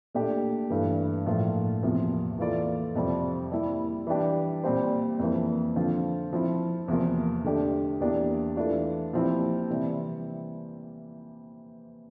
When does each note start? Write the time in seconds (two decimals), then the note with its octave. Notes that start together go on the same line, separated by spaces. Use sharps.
0.14 A#2 A3 D4 G4
0.70 G2 E3 A3
1.26 A2 F3 A#3 F4 A#4
1.83 E2 C3 F3 A#3
2.39 E3 A#3 F4 A4 D5
2.95 F2 C3 G3 C4 F4
3.52 G3 A#3 E4
4.07 E3 G3 D4 G4
4.63 A#2 G3 C4 G4 C5
5.19 F2 E3 A#3
5.76 D3 F3 C4 F4
6.33 F3 C4 E4
6.88 E2 C3 F3 A#3
7.44 D3 A3 D4 G4
8.00 E2 E3 A#3 D4 G4
8.56 E3 A3 D4 F4
9.13 A#2 F3 C4 E4 G4
9.70 C3 E3 G3